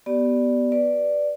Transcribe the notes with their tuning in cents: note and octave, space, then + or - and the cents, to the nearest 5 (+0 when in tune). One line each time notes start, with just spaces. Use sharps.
B3 +0 G4 -25 D5 +0
B4 +0 D5 +0